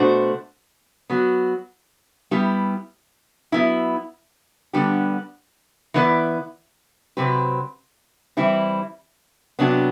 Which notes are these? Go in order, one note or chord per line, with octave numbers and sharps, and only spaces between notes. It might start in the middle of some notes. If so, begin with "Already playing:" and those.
Already playing: B2 A3 D4 F#4 C5
F#3 B3 F#4
G3 B3 E4 G4
F#3 B3 E4
D3 G3 B3 D4 G4
E3 B3 E4 B4 D5
C3 F#3 C4 G4 B4
E3 G3 C4 E4
C3 F#3 B3 D4